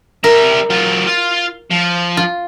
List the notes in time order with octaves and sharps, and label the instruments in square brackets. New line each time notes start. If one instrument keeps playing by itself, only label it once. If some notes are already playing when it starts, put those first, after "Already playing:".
[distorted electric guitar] G3 E5 [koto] A#4
[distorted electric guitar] F#3 F4
F4
F3
[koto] F4